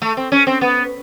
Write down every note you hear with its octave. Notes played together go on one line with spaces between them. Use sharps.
A3
C4
C#4
C4
B3